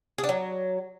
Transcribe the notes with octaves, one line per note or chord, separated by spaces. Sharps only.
G#4
D4
F#3